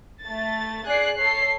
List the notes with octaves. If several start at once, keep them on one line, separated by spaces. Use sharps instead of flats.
A3 A6
G#4 D5 F#6 C7
A4 C#5 C7